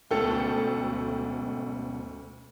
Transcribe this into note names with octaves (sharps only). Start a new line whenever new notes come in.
D2 G#2 B2 C#4 A4 G5